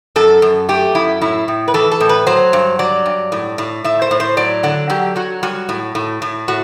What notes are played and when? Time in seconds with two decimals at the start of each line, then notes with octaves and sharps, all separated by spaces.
0.16 F#2 A4
0.42 F#2
0.69 A3 G4
0.95 F#2 E4
1.21 A2 E4
1.48 A2
1.68 B4
1.74 E3 A4
1.91 A4
2.00 A2
2.09 B4
2.27 F#3 C5
2.53 G2
2.79 F#3 D5
3.06 G2
3.32 A2
3.58 A2
3.84 A2 E5
4.02 C5
4.11 A2
4.20 C5
4.37 F#3 D5
4.63 D3 F#5
4.90 F#3 G4
5.16 F#3 F#4
5.43 G3 F#4
5.69 A2
5.95 A2
6.22 A2
6.48 A2 F#4